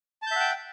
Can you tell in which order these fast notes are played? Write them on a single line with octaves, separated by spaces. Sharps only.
A5 G6 E5 F#5 G5